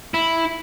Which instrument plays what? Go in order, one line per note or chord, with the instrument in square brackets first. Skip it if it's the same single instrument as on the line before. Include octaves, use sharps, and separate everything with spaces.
[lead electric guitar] E4